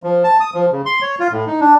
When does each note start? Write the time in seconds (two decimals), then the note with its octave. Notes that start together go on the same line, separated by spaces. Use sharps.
0.03 F3
0.24 A5
0.40 D#6
0.54 F3
0.72 C#3
0.86 C6
1.02 C#5
1.19 F4
1.32 A2
1.47 D#4
1.60 D4